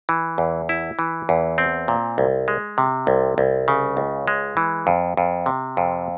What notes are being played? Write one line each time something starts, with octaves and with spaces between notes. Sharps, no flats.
E3
E2
E4
E3
E2
C4
A#2
C2
G#3
C3
C2
C2
C#3
C#2
G#3
E3
F2
F2
C3
F2